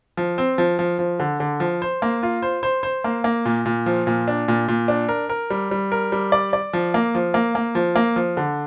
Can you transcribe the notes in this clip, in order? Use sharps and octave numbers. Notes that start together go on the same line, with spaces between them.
F3
C4
F3
F3
F3
D3
D3
F3
C5
A#3
F4
C5
C5
C5
A#3
A#3
A#2
A#2
F3
A#2
D4
A#2
A#2
D4
A#4
A#4
G3
G3
A#4
G3
D5
D5
F3
A#3
F3
A#3
A#3
F3
A#3
F3
D3